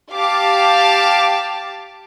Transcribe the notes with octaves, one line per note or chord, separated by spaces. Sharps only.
G4 F5 A5 D6